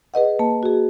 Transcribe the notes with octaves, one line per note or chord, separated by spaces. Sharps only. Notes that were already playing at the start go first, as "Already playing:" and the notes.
G#4 B4 D#5 F#5
A#3 A5
F#4 G#4